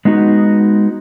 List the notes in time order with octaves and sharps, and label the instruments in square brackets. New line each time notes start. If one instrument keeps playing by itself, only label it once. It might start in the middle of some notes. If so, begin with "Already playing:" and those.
[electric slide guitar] G#3 B3 D#4 F#4